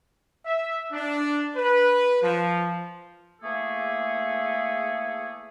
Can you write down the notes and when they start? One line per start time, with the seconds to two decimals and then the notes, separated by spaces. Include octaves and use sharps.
0.45 E5
0.92 D4
1.55 B4
2.22 F3
3.42 E2 A3 A#3 G#4 A4